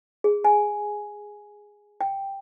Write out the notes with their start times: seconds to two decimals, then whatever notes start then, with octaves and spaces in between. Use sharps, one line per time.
0.24 G#4
0.44 G#5
2.01 G5